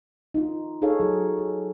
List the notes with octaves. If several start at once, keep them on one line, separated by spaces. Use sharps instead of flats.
D#4 F4
D#4 G#4 A4 C#5 F5
F#3 G#4
A4